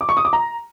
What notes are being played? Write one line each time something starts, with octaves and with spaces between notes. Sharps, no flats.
D6
C#6
D#6
D6
A#5